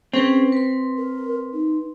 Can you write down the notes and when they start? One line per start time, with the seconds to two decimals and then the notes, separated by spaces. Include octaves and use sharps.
0.13 C4 C#4 G#4 B4
0.52 B4 C6
0.98 A#4
1.53 D#4